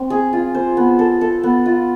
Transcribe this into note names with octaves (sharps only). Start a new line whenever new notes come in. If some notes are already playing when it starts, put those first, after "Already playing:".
Already playing: C4
G#4
F4
C5
B3
A4
A4
B3
F4